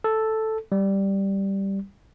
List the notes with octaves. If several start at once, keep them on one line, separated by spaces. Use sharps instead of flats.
A4
G3